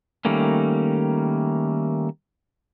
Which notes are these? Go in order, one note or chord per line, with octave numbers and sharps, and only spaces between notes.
D#3 G3 A3 A#3 C#4